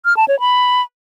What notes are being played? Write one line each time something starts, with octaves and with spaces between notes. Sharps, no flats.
F6
A5
C#5
B5